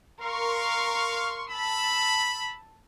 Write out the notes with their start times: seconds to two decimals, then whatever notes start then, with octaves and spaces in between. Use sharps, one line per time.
0.21 A#4 F5 C6 C#6
1.50 A5 B5 E6